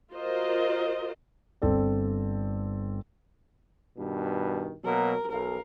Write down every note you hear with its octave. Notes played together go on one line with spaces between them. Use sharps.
F4 F#4 A#4 C5 D#5
G1 C4 A4 D5
G2 B2 D#3
B2 F#3 A#3 A#4
B1 A#4 F5